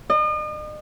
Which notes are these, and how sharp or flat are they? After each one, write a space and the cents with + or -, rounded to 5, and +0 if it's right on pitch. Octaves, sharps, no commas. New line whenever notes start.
D#5 -40